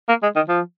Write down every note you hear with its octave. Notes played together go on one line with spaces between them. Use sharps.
A#3
G#3
D#3
F3